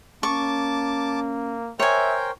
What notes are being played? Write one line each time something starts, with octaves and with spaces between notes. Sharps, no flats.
A#3 C#4 A5 C#6 D6
A#4 C5 C#5 E5 G5 G#5